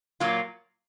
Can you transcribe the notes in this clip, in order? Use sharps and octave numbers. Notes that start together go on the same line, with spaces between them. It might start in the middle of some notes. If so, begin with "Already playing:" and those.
A#2 F#3 A#3 F4